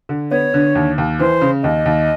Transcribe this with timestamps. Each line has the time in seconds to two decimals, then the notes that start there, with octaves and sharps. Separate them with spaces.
0.09 D3
0.31 B3 C#5
0.54 D3
0.75 D#2
0.98 D#2
1.20 E3 C5
1.41 C#3
1.63 D#2 D#5
1.86 D#2